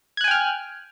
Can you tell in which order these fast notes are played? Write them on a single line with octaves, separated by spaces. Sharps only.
G#6 F#6 G#5 G5 F6